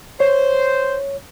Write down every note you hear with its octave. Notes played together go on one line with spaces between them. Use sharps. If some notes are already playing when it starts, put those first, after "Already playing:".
C5 C#5